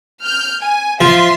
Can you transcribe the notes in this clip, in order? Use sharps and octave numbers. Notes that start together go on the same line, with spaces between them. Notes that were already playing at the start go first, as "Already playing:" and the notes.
F6 G6
G#5
F3 F4 E5 C6